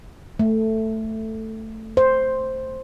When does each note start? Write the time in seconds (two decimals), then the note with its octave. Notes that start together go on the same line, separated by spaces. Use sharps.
0.39 A3
1.97 C5